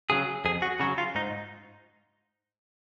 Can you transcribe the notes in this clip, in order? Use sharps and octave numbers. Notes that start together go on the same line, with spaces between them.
C#3 F#3 G#4
F2 G#4
F#4
C#3 F#3 F#4
F4
G#2 D#4